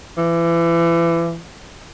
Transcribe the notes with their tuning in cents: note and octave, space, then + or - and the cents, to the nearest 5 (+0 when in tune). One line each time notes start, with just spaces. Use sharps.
E3 +30